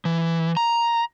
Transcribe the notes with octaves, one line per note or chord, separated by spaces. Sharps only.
E3
A#5